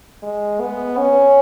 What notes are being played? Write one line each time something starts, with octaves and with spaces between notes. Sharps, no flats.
G#3
B3
C#4